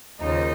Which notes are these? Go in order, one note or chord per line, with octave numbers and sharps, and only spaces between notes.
D#2 C#3 F3 A#3 D#4